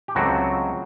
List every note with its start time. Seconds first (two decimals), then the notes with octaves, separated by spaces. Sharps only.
0.08 G4
0.15 C#2 C#3 F#3 A3 C4 F#4